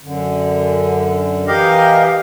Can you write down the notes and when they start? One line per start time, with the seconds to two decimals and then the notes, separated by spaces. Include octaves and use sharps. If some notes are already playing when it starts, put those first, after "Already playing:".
0.01 F#2 D3
1.48 E3 G4 A#4 D#5 F5